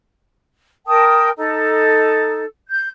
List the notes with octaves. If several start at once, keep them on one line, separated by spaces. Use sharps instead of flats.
A#4 G5 A5 D#6
D#4 A4
G6